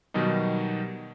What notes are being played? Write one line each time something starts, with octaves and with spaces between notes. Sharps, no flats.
B2 D#3 F#3 G3 D#4